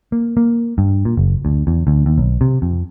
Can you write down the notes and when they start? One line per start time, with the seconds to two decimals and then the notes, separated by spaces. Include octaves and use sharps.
0.12 A#3
0.37 A#3
0.78 G2
1.05 A#2
1.17 F#1
1.45 D2
1.67 E2
1.87 D2
2.06 D#2
2.18 B1
2.41 C3
2.62 F2